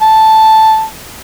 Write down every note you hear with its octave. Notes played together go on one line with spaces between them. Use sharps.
A5